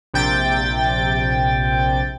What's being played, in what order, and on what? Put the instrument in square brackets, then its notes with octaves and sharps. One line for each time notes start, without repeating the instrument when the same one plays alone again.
[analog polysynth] A#1 C3 G5 A6